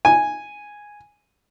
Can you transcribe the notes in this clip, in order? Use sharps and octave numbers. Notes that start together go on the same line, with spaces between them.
G#5